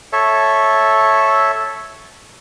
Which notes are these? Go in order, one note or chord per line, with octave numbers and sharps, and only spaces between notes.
A4 C#5 E5